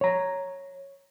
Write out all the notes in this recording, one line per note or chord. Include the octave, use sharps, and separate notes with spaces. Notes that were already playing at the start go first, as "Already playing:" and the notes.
C#5 A#5